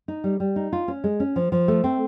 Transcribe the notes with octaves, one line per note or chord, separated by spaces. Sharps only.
D#4
G3
G3
D#4
F4
C#4
G#3
C#4
F3
F3
A3
C4